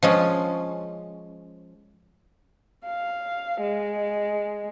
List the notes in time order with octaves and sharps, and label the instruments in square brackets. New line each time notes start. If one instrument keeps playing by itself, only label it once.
[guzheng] F3 G#3 C#4
[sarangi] F5
G#3